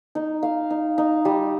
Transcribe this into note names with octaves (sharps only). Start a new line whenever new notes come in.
D#4
F5
D#4
D#4
G3